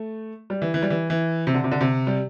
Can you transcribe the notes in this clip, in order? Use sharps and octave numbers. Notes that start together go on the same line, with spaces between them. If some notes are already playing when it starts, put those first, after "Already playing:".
Already playing: A3
G3
E3
E3
G3
E3
E3
C3
D3
C3
D3
C3
G3